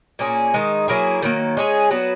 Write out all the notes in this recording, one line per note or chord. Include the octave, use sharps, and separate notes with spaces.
A#2 A#3 C#4 G#4
D#3 G#3 D#4
F#3 A#3 E4 G#4
D#3 F#3 A#3
G#3 C#4 G#4
F#3 B3 F#4